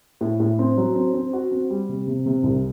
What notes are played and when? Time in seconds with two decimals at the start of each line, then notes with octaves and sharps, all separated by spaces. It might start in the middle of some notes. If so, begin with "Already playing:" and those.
0.21 A2
0.40 A2
0.59 C4
0.77 F#3
0.95 C4
1.14 C4
1.33 F#4
1.51 C4
1.70 G3
1.89 C3
2.07 C3
2.26 C3
2.43 C2